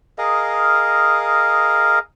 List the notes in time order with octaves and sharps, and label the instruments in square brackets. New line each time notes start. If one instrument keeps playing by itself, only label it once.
[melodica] G#4 A#4 D#5 F5